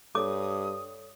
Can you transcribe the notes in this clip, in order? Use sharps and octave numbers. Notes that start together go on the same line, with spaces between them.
G2 A4 C#5 D6 D#6